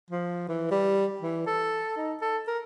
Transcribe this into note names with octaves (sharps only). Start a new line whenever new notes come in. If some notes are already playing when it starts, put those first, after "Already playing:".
F3
E3
G3
E3
A4
D#4
A4
A#4